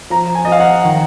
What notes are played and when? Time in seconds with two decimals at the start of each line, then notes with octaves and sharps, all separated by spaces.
0.10 F3 A#5
0.35 G#5
0.45 F3 D#5
0.52 F5
0.60 F#5
0.85 D#3